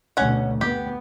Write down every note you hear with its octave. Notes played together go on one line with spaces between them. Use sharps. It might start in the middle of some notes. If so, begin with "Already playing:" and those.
D2 B2 C#4 F#5
B3 G4